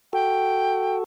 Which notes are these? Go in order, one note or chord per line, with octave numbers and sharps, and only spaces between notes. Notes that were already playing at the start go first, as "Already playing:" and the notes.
F#4 A4 G5